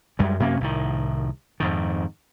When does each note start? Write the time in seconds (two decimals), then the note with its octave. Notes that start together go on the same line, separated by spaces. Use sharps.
0.19 F#2 G3 G#3
0.40 F#2 C3 A#3 C#4
0.61 C2 A2 D#3
1.60 F2 G#2 D#3